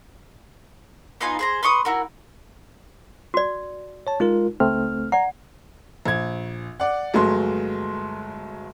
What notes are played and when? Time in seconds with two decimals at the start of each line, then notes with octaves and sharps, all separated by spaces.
1.21 B3 D#4 F4 G#5
1.39 G#4 C5 A#5
1.63 B4 C6 C#6 D#6
1.85 E4 F#4 A#4
3.34 F#4 D5
4.07 C#5 A5
4.20 G#3 D#4 F4 A#4
4.60 C#2 A3 C4 F6
5.12 D5 F#5 A#5
6.06 A#1 G#6
6.80 D5 F#5
7.14 G1 F#3 G#3 A3 C6